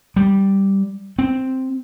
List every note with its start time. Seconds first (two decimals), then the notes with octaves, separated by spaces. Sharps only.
0.16 G3
1.19 C4